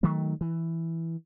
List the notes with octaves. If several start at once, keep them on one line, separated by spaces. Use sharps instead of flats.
D#3 F#3 A3
E3